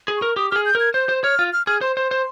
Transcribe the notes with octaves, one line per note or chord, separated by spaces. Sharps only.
G#4
A#4 C#6
G4 D#6
G4 G#4 F6
G6
A#4
G#6
C5 G6
C5
C#5 F6
F4
F6
G#4 F6
C5 C6
C5 C6
C5